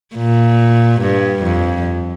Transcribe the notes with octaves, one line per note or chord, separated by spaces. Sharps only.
A#2
G2
F2